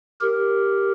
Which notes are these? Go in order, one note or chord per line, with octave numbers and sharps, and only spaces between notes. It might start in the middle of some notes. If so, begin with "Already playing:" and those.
G4 A#4